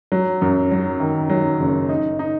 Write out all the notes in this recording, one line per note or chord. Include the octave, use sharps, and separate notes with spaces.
F#3
F#2
F#3
D#3
F#3
F#1
D#4
D#4